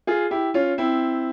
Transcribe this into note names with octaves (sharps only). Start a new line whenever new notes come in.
F4 G#4
E4 G4
C#4 F4
C4 E4